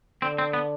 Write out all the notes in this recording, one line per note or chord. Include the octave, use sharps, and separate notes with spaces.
D3 C4
C4
B3